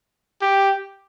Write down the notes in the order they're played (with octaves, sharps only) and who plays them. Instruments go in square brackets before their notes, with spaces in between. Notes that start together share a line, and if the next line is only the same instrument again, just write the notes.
[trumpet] G4